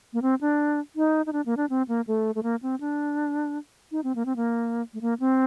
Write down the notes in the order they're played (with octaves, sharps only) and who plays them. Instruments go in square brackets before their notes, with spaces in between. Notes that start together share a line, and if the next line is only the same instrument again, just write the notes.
[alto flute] A#3
C4
D4
D#4
D#4
D4
A#3
D4
C4
A#3
A3
A3
A#3
C4
D4
D#4
C4
A#3
C4
A#3
A3
A#3
C4